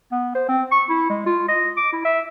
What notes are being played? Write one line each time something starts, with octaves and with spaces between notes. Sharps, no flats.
B3
C5
C4
C#6
E4
G#3
F4
D#5
D6
E4
E5